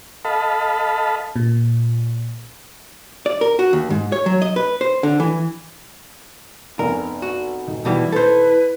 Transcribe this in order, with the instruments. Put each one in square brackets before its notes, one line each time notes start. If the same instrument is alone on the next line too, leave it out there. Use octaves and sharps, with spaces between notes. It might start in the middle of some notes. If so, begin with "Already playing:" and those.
[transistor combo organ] A4 D#5 F5 A5 B5
[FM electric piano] A#2
[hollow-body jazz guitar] D5
A#4
F#4
D#2
G#2
C#5
F#3
D#5
B4
C5
D3
E3
[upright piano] F1 B3 G#5 [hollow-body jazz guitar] A#4
[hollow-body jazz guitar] F#4
[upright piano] D#1 D#4
[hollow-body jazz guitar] B2 E3 G3 [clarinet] E4
[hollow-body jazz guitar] A4 C5 [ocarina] B4